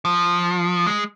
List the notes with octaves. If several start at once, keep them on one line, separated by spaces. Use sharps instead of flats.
F3
G#3